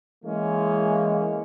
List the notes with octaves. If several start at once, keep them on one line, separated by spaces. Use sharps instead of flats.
E3 G#3 A#3 C#4